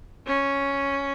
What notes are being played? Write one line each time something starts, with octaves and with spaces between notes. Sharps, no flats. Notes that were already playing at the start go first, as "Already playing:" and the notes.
C#4